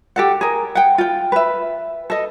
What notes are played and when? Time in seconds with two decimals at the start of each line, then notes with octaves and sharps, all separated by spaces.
0.16 G4 A4 F#5
0.41 G#4 A#4
0.75 F#5 G5
0.98 F4 G5
1.32 B4 E5
2.10 A4 D#5